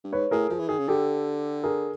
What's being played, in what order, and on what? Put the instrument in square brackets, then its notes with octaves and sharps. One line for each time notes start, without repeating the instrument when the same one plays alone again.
[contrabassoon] G2
[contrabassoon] G#2 [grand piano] B4 C#5
[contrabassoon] A2 [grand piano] G#4 A#4
[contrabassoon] F3 [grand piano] G#4
[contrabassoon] E3
[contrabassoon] D#3 [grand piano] G#4
[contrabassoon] C#3
[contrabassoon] D3 [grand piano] G4 A4
[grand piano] G#4 A#4